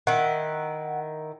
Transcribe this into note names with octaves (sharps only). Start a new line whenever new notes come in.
D#3 E4 F#5